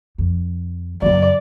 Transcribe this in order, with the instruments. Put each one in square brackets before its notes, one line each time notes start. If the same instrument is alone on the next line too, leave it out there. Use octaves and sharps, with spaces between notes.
[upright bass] F2
[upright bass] F#2 C#3 [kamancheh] D5